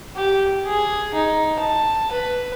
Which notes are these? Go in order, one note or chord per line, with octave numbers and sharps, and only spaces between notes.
G4
G#4
D#4
A5
B4